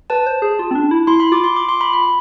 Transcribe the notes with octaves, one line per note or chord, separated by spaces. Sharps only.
B4 A5
C5
G#4
F4
C4
D4
E4
E4 C6
B5
F4 D6
C6
D6
C6
B5
B5